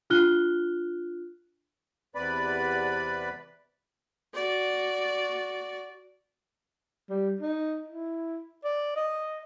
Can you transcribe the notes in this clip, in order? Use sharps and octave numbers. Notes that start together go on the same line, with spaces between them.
D4 F4 F6 F#6 G7
E2 C3 B4 D5 B5
F#4 D5
G3
D#4
E4
D5
D#5